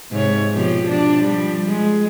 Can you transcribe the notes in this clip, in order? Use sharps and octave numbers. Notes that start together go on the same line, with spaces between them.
G#2 C3 C#5
B2 F3 G4
D4
F3 G3
G#3